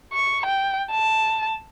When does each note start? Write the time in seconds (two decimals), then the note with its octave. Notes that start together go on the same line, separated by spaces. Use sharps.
0.13 C#6
0.46 G5
0.91 A5